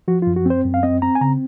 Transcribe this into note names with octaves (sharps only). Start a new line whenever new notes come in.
F3 F#4
F#2 F4
F#4
C4 C5
F#2
F5
C4 D#5
C4 A#5
G#5
C#3 A#5